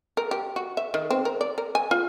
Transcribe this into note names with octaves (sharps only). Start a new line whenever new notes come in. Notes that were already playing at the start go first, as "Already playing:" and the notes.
A#4
G4
F#4
E5
D#3
C4
A#4
D5
A#4
G#5
F4